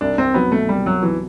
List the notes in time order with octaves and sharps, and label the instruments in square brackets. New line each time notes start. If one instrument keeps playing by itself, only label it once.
[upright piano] C2 [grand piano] D4
[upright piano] C2 [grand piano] C4
[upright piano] F#3 [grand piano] B3
[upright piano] B2 [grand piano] A3
[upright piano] C2 [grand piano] G3
[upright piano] C2 [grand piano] F#3
[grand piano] E3 [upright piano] F#3